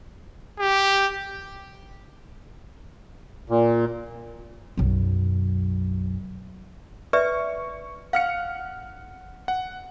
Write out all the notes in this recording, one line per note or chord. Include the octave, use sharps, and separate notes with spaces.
G4
A#2
B1 F#2
B4 D5 E5 C#6
F5 F#5 F6 C#7
F#5